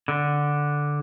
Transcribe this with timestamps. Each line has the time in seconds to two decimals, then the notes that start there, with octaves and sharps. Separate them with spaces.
0.08 D3